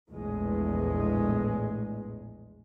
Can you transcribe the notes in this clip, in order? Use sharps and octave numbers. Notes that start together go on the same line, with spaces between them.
A#1 E2 A2 G#3